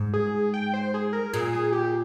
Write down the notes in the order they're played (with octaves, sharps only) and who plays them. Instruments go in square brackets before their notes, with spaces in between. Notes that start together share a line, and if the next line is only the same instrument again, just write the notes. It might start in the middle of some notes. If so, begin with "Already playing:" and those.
Already playing: [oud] G#2
[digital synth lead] G#4
G5
C5
G#4
A#4
[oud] A#2 [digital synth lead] G#4
[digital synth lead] G#4
G4